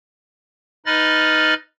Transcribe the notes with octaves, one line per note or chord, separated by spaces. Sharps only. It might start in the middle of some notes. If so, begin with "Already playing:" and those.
D#4 B4 D#5 B5 F6 A6